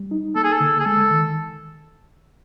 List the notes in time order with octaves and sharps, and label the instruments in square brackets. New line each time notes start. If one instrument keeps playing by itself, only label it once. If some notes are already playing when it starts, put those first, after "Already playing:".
Already playing: [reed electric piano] G3
D#4
[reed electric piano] A#3 [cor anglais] A4
[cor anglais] G#4
A4
[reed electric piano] D3
[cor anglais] G#4
[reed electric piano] G#3 [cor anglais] A4
[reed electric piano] D#3